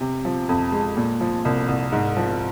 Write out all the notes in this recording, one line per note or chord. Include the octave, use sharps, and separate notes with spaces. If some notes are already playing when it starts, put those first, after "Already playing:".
C3
F3
F2
G#3
A#2
F3
C2
C2
G#2
F3